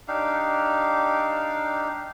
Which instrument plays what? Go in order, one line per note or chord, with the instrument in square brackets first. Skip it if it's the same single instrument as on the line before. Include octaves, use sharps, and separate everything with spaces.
[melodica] D4 D#4 G4 F5